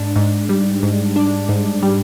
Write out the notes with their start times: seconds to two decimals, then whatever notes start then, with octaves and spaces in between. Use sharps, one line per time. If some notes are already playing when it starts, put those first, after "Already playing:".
Already playing: G#2 D4
0.16 G#2
0.49 G3
0.83 G#2
1.16 D4
1.49 G#2
1.82 G3